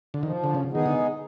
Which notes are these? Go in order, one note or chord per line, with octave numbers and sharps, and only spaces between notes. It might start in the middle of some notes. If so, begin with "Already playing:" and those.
D3
D#3 F3
D3
C#3
D#3 G#3 B3 D#4 G#4
D3